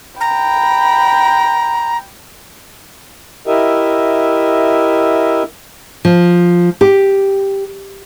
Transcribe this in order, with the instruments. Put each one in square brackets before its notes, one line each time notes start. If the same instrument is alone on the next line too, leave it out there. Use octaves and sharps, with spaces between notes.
[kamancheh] G5 B5 [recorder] A#5
[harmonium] E4 G4 A#4 D#5 E5
[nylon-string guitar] F3
G4